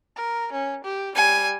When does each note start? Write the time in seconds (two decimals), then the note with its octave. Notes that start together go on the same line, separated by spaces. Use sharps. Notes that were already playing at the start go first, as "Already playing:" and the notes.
0.16 A#4
0.52 C#4
0.84 G4
1.16 G3 G#5